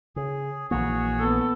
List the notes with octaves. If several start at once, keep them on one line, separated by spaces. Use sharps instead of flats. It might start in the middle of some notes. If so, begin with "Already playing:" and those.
C#3 G#4
A#1 E3 A#3 F#4 G#4 C#5
B3 A4